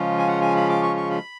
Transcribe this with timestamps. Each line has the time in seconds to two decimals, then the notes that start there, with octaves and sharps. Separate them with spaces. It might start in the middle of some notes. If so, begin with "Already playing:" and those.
Already playing: C#3 F3 G#3 C#4 F4
0.18 G#5
0.27 F#5
0.41 G#5
0.56 B5
0.69 D6
0.83 C#6
0.96 C#6
1.11 B5